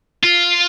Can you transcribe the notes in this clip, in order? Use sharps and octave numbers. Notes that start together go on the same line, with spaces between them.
F4